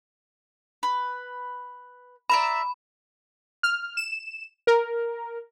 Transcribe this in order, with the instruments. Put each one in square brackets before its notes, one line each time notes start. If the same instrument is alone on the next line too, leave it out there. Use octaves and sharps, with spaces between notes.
[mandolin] B4
[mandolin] D5 E5 A#5 [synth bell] B5
[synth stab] F6
E7
A#4